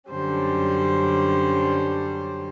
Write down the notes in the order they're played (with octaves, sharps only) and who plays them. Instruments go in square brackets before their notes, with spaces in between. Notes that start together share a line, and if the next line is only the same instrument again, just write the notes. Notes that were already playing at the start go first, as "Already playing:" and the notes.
[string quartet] F#2 D3 G3 C#4 C5